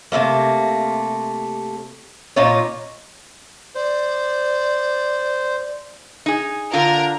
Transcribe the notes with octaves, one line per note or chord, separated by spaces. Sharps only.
C3 G3 A3 A#3
A#2 D#4 F4 C#5
C5 D5
D#4 G#4
D3 F4 A#4